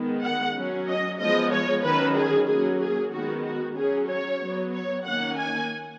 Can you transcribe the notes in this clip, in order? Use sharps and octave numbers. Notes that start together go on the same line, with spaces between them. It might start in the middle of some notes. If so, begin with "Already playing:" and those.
Already playing: D#3 G#3 B3
F#5
F#3 C#4
D#5
F3 G#3 B3 D#5
C#5
D#3 F#3 C#4 B4
G#4
F#3 A#3 C#4 G#4
G#4
D#3 G#3 B3 F#4
F#4
F#3 C#4 G#4
C#5
F#3 B3
C#5
D#3 A#3 C#4 F#5
G#5